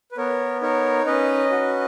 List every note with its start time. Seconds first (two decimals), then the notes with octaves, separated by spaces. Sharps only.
0.12 B4
0.17 B3 A#4 C#5
0.62 D#4 A#4 C#5
1.06 C#4 B4 D#5
1.51 F#4